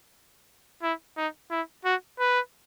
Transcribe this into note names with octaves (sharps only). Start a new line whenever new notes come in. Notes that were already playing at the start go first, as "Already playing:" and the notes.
E4
D#4
E4
F#4
B4